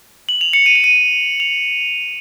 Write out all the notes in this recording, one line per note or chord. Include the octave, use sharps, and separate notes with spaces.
F#7
F7
C#7
D#7
F7
D#7
F7